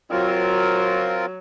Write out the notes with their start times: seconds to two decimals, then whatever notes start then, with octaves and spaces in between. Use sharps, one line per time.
0.11 F#3 C4 F4 A#4